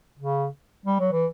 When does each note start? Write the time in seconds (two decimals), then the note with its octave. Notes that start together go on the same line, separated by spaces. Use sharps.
0.19 C#3
0.86 G3
1.00 F#3
1.12 E3